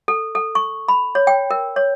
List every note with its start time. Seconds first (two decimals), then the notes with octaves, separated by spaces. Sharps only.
0.08 A4
0.35 A4
0.55 C#6
0.88 B5
1.15 C#5
1.27 G5
1.51 A#4
1.76 C#5